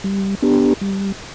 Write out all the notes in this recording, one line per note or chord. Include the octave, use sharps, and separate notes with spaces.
G3
B3 D4 G4
G3